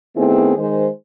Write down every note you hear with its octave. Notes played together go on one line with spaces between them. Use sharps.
D#3 A3 B3 C4 E4 G#4
D#3 G#3 C5